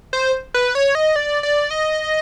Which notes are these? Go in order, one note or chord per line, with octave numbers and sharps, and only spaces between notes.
C5
B4
C#5
D#5
D5
D5
D#5